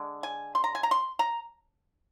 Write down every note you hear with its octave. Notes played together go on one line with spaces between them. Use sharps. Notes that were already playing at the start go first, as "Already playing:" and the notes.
Already playing: D3 G#3
G#5
C6
A#5
G#5
A#5
C6
A#5